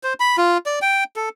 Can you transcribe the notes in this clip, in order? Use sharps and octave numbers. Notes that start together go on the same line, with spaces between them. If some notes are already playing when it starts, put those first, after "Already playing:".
C5
B5
F4
D5
G5
A4